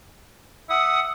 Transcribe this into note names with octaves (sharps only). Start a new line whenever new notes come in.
E5 F#5 D#6